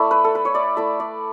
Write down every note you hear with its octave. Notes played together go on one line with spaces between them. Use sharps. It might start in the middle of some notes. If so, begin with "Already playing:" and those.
Already playing: A3 E4 D5 E5
B4
A4
B4
C#5
D5
A3 E4 E5
D5